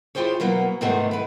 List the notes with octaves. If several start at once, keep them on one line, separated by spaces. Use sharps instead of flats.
E4 F4 G4 G#4 C5 C#5
B2 F#3 A#3 B3
G#2 C3 D#3 A3 B3 D4
E4 B4